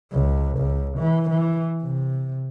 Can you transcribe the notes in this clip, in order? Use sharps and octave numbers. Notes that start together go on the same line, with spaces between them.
C#2
C#2
E3
E3
C3